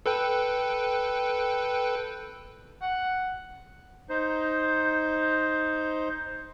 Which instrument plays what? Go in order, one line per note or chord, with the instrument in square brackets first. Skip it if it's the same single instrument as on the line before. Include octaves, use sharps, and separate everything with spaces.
[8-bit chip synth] A4 B4 G5
[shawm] F#5
[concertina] D#4 C5